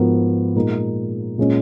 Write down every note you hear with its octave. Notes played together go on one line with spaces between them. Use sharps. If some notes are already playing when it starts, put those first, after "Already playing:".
Already playing: G#2 F3 B3 F#4 A#4
A#2 G#3 D#4 A#4
A#2 G#3 C#4